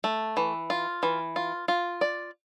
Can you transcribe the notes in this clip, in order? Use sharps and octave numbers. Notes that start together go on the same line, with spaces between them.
A3
E3
F4
E3
F4
F4
D5